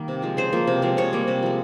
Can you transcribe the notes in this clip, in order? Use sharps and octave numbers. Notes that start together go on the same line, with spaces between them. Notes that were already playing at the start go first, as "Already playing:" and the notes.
Already playing: D#3 G3 A#3
C3
F3 G#3
C#3 C5
F3 A#3
C3
F3 G#3
C3 C#5
G3 A#3
C3
F3 G#3